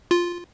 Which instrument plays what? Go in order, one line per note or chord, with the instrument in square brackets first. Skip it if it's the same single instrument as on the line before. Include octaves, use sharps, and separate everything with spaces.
[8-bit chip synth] F4